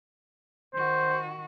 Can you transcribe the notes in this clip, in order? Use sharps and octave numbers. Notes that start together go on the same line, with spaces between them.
D#3 F#4 C5